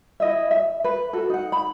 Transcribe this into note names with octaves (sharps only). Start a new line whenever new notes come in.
E4 D#5 E5
E5
B4
F#4 A4
D#4 F#5
B5